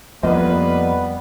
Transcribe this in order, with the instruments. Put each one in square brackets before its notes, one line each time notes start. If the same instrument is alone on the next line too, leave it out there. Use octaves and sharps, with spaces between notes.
[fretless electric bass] F2 [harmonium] G3 B3 [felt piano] A#3 F4 D#5 [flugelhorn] B4